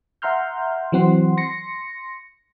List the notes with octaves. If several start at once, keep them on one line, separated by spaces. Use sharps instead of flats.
E5 F#5 A#5 C6 F6 G6
E3 F#3 C4 F#5 C6
C6 A#6 C#7